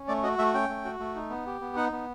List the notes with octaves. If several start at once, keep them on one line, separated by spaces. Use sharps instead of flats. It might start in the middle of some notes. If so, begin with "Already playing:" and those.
Already playing: C#4
A3 D5
F#4 D#5
A3 E5
C#4 G5
A3
F#4
A3
D#4
B3
G4
B3
D#4 F#5
B3